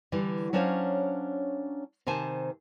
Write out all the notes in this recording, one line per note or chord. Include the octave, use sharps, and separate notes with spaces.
D3 E3 G3
F#3 C#4 D4 C5 C#5 F5
C3 D#3 C5 G#5 A5